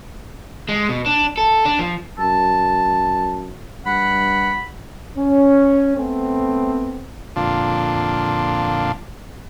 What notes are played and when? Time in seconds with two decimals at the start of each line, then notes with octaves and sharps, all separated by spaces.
0.69 G#3
0.89 B2
1.06 D4
1.38 A4
1.65 D4
1.79 F3
2.19 F#2 A5
3.86 G2 F#5 B5
5.18 C#4
5.98 A3 B3 C4
7.36 F2 A#2 D3 D4 F4